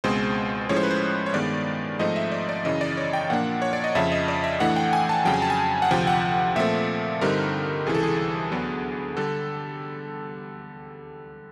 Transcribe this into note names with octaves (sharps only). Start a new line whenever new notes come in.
C#2 B2 G#3 C4 C5
A2 F3 G#3 C#4 C#5
C5
B4
C5
C#5
G2 D#3 G#3 B3 D5
G#2 F3 A3 C4 D#4 D#5
E5
D5
D5
F#2 C#3 E3 D#5
D5
C#5
G5
A#2 F3 A#3 D4 F#5
C#5
D5
D#5
F2 C#3 F3 E5
D#5
D5
E5
A2 E3 A3 D4 F#5
G5
G#5
A5
F2 C#3 F#3 G5
G#5
A5
G#5
F#5
D2 C3 F3 G5
F#5
A#2 F3 A3 C4 E5
G2 D3 G3 C4 D#4 A#4
C#2 C3 E3 G#4
A4
G#4
D2 D3 F#3 B3 D4
D3 G3 A4